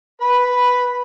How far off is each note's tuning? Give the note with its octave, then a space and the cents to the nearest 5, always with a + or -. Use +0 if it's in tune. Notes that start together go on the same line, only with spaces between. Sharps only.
B4 +0 B5 -5